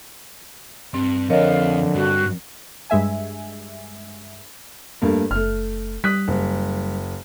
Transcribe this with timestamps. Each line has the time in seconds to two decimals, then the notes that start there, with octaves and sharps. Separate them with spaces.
0.94 G2 C4
1.30 F2 D3 C4 A#4 C#5 D#5 F5
1.95 G2 F#4
2.90 G2 G#3 E5 G#5
5.02 G2 A3 A#3
5.31 F#1 A3 F6
6.04 G3 D#6 F#6 B6
6.28 F#1